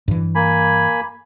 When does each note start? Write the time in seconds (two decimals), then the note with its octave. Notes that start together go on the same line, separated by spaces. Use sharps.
0.08 G2 E3
0.35 A#3 G#5 B5